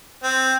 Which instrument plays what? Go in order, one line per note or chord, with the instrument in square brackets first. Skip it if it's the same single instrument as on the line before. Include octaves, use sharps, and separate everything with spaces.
[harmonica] C4